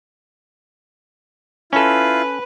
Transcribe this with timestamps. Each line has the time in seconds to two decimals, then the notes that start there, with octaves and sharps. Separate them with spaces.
1.73 C#4 E4 F4 A4 B4